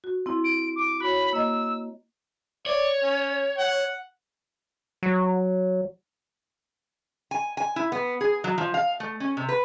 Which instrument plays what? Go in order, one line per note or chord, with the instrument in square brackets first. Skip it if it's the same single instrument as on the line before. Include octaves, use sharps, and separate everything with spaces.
[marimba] F#4
C4 E4
[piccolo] D7
D6
[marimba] F#4 C#5 [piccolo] B5
[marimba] A#3 D#5 [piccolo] E6
[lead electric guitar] C#5 [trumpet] D5
[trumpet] C#4
F#5
[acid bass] F#3
[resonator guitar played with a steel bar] G#5
G#5
E4
B3
G#4
F#3
F3
F5
A3
C#4
C3
B4